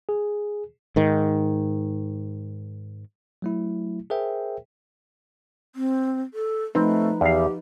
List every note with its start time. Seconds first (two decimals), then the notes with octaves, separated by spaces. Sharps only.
0.09 G#4
0.96 G#2 D#3
3.42 F#3 A3 E4
4.10 G#4 A#4 C5 E5 G5
5.75 C4
6.34 A4
6.75 F3 A3 C4 D#4 B4
7.21 E2 G4 F5